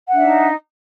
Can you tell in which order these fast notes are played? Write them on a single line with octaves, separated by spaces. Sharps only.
F#5 D4 E5 D#4